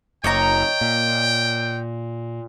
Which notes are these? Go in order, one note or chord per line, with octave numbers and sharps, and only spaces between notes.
F#1 C#5 D#5 G5 A#5
A#2